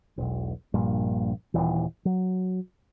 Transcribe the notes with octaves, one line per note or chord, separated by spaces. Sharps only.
E1 B1
A#1 G2 A#2
D#1 E3
F#3